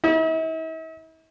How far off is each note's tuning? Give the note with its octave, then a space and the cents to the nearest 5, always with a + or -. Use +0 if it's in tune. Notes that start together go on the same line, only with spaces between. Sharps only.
E4 -45